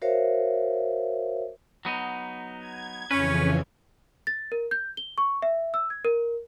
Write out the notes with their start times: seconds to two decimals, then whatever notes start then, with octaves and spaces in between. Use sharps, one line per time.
0.02 F#4 A#4 C5 C#5 E5 F5
1.85 F#3 B3 D#4
2.59 G#6
3.11 F2 C#3 E3 C#4 B4
4.27 A6
4.52 A#4
4.71 G6
4.97 G7
5.18 C#6
5.42 E5
5.74 E6
5.90 G#6
6.05 A#4